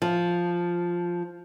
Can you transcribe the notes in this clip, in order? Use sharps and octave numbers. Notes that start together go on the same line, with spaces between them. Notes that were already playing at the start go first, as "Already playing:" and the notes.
F3